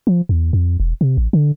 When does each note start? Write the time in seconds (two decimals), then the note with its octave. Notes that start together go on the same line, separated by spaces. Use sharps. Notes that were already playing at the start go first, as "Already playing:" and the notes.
0.07 F3
0.29 E2
0.53 F2
0.80 E1
1.01 C3
1.18 A1
1.33 D3